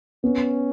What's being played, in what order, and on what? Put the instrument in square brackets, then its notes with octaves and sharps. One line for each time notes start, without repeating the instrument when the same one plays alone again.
[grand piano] B3 [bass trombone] C#4